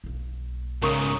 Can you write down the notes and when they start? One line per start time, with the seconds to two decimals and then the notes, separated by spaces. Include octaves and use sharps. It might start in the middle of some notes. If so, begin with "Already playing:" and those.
0.04 B1 A#3
0.82 G#2 C#3 A#4 A#5 C#6 D#6